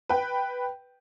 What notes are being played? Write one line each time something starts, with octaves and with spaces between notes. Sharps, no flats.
B4 G5